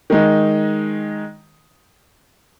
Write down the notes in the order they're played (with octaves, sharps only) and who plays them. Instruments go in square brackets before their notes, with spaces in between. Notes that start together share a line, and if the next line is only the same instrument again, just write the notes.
[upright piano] D#3 G#3 D#4